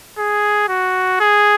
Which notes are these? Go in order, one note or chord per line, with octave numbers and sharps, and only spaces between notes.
G#4
F#4
G#4